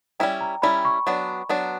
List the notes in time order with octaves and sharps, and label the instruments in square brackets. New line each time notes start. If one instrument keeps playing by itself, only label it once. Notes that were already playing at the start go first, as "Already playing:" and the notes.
[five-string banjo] G3 C#4 E4 [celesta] G5
[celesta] A#5
[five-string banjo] G3 C#4 E4 [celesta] B5
[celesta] C#6
[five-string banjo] F#3 B3 D4
F#3 B3 D4